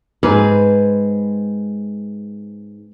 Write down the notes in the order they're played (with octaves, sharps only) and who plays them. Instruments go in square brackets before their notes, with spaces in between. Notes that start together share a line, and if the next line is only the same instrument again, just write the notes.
[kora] G#2 [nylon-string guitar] C4 G#4 B4